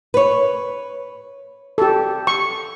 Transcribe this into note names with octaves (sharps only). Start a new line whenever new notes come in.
B4 C#5
G4 A4
C#6